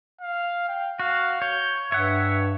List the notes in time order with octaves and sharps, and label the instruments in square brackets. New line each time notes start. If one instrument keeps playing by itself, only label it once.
[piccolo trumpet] F5
G5
[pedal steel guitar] F#4 [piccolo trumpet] F5
[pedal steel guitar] C#5 [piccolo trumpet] G6
[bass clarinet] G2 [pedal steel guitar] C#5 F#5 [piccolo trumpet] E5